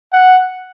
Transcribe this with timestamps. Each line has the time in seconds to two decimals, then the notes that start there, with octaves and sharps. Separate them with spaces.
0.13 F#5